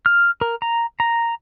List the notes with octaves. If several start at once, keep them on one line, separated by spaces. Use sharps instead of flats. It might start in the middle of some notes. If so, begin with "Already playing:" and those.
F6
A#4
A#5
A#5